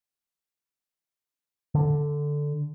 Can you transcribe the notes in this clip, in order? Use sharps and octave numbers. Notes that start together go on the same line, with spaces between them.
D3